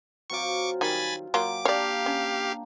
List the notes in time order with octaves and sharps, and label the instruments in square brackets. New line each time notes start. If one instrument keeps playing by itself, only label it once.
[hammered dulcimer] F#3 C4 F4 [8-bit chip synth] C#6 D6
[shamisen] D#3 G3 [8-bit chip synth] G#5 B5 A6
[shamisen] F#3 A#3 F4 [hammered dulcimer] G4 [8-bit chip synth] D6
[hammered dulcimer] A#3 D4 [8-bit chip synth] G4 F5 [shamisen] C#5 D5
[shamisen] C#4